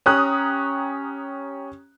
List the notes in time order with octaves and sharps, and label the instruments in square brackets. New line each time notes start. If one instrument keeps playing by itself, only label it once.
[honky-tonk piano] C#4 G4 A#5 D#6 F#6